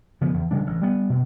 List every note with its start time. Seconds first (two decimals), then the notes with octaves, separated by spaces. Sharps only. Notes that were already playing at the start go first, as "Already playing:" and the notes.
0.21 C#3 F3 B3
0.34 E2
0.51 C#3 G3 D4
0.67 A1
0.82 G3 B3
1.09 B2